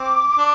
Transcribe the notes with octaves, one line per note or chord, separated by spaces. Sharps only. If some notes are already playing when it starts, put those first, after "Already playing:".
Already playing: C4 D6
D4